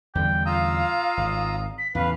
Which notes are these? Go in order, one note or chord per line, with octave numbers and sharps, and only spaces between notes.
E2 D3 G3 G5
F4 F5 A#5 D#6 E6
G#1
B6
E2 A2 C#3 B4 F5